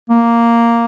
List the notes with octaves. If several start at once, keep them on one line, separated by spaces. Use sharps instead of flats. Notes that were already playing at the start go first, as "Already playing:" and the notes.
A#3